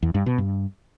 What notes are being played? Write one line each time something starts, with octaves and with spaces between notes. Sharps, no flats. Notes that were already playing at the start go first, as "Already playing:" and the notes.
E2
G2
B2
G2